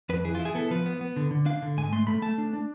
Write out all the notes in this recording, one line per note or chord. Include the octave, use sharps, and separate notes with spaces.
F2 B4
E3 G#4
F4
E4
G#4
B3 A4
F3 B4
B3
B3
D3
D3
D4 F5
D3
G#2 G#5
A3 C6
A3 B5
A3 A5
D4
D4